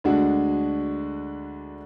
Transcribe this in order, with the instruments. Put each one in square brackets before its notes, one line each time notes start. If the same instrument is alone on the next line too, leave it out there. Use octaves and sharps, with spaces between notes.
[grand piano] D2 D3 G#3 D4 F#4